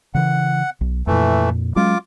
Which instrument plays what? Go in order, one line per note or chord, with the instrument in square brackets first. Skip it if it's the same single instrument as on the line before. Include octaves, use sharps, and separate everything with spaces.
[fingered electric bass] C#3 E3 [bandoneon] F#5
[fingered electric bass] B1
[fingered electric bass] F2 A#2 [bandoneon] E3 A3
[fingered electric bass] F#3 G#3 C#4 [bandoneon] F4 D6